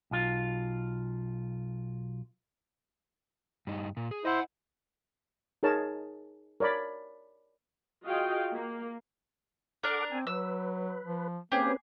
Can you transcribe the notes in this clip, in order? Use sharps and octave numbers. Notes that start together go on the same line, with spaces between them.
B1 F4
G2 D#4
A#2
G#4
E4 C5 D#5 F#5
D#4 G#4 A#4 C#5 A5
A#4 C#5 D5 B5
F4 F#4 G#4 D#5 F5 G5
A#3
D4 A4 A#4 F#5 D6
C4 G#5
F#3 B4 E6
F3
A#3 C4 C#4 G4 G#4 B4